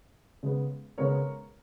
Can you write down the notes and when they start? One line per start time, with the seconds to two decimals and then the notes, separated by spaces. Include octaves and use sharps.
0.43 C#3 G#3 B3
0.98 C#3 G#3 B3 A#4 C#5